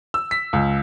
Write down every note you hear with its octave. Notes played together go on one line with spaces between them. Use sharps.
E6
B6
C#2